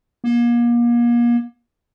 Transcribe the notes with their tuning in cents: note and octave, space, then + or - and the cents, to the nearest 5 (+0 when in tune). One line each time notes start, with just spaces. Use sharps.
A#3 +35